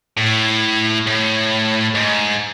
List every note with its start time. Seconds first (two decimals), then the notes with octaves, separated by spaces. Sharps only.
0.17 A2
1.07 A2
1.95 G#2